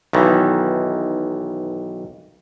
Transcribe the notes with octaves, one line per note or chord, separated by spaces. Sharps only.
B1 D#3 E3